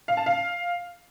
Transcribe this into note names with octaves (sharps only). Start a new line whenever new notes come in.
F5
A5
F5